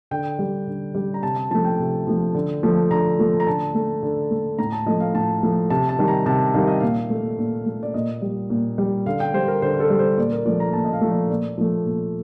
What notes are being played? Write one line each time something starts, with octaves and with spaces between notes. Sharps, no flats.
D3 G5
G3
D3
G3
A#5
C3 A5
A5
F3 A3 A5
G5
C3
F3 A3
D3
F3 A3
D3 A#5
F3 A3
A#5
D3 A5
A3
D3
A3
A2 A#5
A5
F3 A3 D#5
F5
A2 A5
F3 A3
C3 A5
A5
D#3 G3
A#5
C3 A5
D#3 G3 F5
D#5
A#2 F5
A3
A#2
A3
D5
A#2 D#5
G3
A#2
G3
D3 F5
G5
G3 C5
A#4
D3 C5
A4
G3
C5
A#2 D5
A#4
F3 A3 D5
A#5
A#2 A5
D#5
F5
F3 A3
D5
A#2 D5
F3 A3
A#2